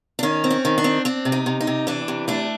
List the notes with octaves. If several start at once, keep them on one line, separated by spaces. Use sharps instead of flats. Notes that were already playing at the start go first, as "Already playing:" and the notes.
D4
D#3 C#4
C4
C#4
D#3
D4
C4
C4 D4
C3
D#4
C3
D#4
C3
E3 D4
C3
A3 D4